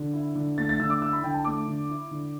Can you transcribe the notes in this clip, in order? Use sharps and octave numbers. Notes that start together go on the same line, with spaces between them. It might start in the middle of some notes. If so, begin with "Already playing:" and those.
Already playing: D3
E4
D3
A3 A6
A6
D3 E6
D6
E4 E6
B5
D3 G5
A5
A3 D6
D3
E4
D3